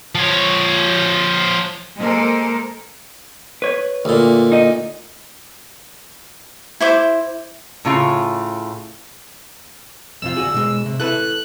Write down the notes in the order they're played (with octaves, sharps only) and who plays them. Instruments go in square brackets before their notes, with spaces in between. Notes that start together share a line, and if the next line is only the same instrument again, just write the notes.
[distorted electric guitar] F3 C#5
[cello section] G#3 A#3 A4 A#4 C5
[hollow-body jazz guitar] B4 C#5
[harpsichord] D2 A#2
[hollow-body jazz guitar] D#4 D#5
[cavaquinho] E4 C5 D6
[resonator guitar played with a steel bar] A2 C#3 F4
[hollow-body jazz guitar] F2 C3 F4 [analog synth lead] E6
[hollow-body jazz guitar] D2 F#4 G#4
B2 G#3
C3
[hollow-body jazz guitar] E4 A4 B4 [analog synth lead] F#6